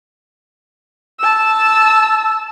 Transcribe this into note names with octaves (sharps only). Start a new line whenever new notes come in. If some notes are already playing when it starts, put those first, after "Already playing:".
A5 E6